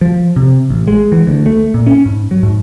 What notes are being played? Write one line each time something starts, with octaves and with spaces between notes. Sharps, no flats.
F3
C3
A1
G#3
E3
D2
A3
A#2
C#4
G#2
F#3
G#2